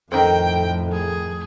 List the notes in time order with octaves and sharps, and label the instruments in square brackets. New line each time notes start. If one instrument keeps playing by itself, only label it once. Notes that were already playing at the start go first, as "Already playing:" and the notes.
[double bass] F2 A2 [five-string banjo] D#3 C4 [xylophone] A4 A#4 D#5 [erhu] G5
[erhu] G#4